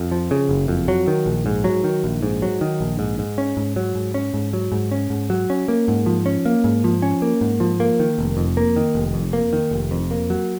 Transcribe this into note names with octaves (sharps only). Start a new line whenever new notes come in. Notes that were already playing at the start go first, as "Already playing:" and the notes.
Already playing: F2
F3
C#3
F#1
F2
F#3
D#3
A#1
G#2
F#3
D#3
A#1
G#2
F#3
D#3
A#1
G#2
G#2
C#4
G#2
F#3
G#2
C#4
G#2
F#3
G#2
C#4
G#2
F#3
C#4
A#3
G#2
F3
C#4
A#3
G#2
F3
C#4
A#3
G#2
F3
A#3
D#3
F1
F2
A#3
D#3
F1
F2
A#3
D#3
F1
F2
A#3
F#3